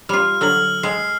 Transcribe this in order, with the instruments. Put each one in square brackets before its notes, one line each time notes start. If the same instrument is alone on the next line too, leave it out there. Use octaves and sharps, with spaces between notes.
[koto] G3 F4 [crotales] F6
[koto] D3 F#3 [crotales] E6 F6 F#7
[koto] G#3 [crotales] C7